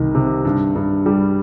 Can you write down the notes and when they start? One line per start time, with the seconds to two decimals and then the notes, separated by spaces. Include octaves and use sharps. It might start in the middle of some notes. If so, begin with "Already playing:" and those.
Already playing: C2 D#3
0.15 C3
0.45 G2
0.75 G2
1.06 G3